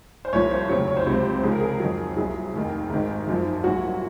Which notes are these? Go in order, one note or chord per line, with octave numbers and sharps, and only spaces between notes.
C5
C2 A#2 F3 C#5
C5
F1 D#2 C#3 F#3 C#5
C#5
C5
C#2 C3 F#3
C#2 C#3 F3 G#4
A#4
G#4
F2 D#3 F#3
C2 A#2 F#3 G#4
F1 D#2 D#3
G#1 G#2 D#3
G#1 F#2 F3
C2 A#2 F#3 F#4